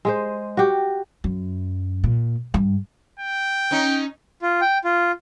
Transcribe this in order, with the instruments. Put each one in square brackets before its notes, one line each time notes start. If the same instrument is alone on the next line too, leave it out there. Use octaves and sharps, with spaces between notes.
[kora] G#3 G#4 C5
F#4 G4
[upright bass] F#2
A#2
G2
[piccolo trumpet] G5
[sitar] C#4 D#4
[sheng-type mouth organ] F4
G5
F4